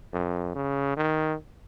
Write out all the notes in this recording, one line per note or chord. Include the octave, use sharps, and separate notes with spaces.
F2
C#3
D#3